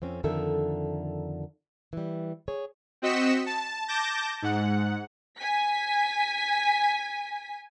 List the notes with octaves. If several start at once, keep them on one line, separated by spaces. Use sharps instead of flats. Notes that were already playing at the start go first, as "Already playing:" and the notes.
F2 C4 C#4
F2 D3 D#3 A4 A#4 E5
E3 G3
G#4 C#5
C4 F#4 D#5 B6 C#7 E7
A5
A5 D6 G6 A#6
G#2 F#5
G#5 B6